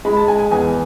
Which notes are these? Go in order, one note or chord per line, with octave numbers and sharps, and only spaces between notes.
G#3 B5
A5
G#3 G#5
G#5
E2 G#5